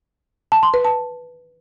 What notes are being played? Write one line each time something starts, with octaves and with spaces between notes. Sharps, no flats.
A5
C6
B4
A5